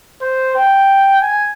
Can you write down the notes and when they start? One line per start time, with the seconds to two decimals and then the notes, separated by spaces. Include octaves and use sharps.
0.22 C5
0.56 G5
1.22 G#5